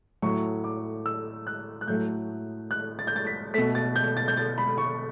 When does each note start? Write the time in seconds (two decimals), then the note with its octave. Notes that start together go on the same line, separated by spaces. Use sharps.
0.22 A2 F#3 A3 C#6
0.64 D6
1.06 E6
1.47 F#6
1.81 F#6
1.87 A2 F#3 A3 G6
2.71 F#6
2.99 A6
3.07 G6
3.16 A6
3.26 B6
3.54 B2 A3 B6
3.75 A6
3.96 G6
4.17 A6
4.28 G6
4.37 A6
4.58 B5
4.78 C#6